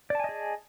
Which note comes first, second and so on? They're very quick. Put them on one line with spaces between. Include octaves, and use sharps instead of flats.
D5 A5 G#5 D#5 G#4